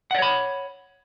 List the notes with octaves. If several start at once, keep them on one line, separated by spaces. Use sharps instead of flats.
C#5 D5 F#5 B5